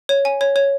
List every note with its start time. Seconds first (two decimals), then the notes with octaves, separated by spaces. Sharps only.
0.09 C#5
0.25 G#5
0.41 C#5
0.56 C#5